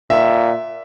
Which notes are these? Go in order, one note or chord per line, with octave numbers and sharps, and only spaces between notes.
A#2 E5